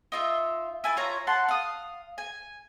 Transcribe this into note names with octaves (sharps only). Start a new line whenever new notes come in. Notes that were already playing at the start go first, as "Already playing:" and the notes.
D#4 F4 E5
E4 G#5 A5
F4 C#5 A#5
F#5 A5 C6
F5 D#6
G#5